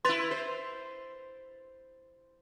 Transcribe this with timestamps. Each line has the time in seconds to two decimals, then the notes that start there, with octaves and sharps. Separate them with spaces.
0.05 E4 B4 C6 A6 F7
0.31 C5